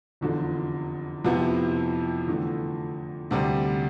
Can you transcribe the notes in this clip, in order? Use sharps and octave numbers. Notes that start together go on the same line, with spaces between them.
F1 E2 D3 F3
F2 C3 F3 B3 E4
E2 D3 A3
D2 C3 G3